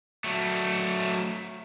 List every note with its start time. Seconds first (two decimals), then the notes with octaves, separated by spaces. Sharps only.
0.24 F#3 A3